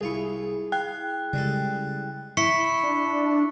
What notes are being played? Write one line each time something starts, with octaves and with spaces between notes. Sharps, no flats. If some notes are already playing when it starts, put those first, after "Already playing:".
C2 E4 F4 G#4 C#6
F5 G5 F#6
C#3 G3 G#3 A4
E4 C#6 B6 C#7
D4